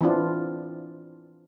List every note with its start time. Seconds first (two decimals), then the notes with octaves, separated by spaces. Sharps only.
0.01 E3 C4 D4 F4